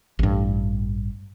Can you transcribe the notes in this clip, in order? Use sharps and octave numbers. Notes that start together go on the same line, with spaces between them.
A1 G2